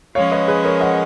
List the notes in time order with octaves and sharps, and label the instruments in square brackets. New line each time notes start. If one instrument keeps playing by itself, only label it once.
[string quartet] F3 G#3 C#4 [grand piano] C#5 F5
[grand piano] B4 D#5
G#4 B4
A#4 C#5
D#5 F#5